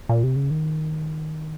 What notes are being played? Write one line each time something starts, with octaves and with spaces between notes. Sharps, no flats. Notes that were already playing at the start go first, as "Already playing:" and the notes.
A#2
C3
C#3
D#3